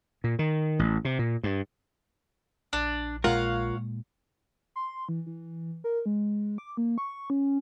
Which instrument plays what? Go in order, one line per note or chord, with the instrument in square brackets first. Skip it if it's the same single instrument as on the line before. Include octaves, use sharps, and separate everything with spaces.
[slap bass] A#2
D#3
A1
C3
A#2
G2
[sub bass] A#1 [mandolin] D4
[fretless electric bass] A#2 G#3 [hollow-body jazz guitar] F4 A#4 [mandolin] C#5 F5 F#5
[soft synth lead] C6
E3
E3
A#4
G#3
D6
A#3
C#6
C#4